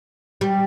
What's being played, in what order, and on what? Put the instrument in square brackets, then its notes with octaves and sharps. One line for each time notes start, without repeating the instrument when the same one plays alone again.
[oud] G3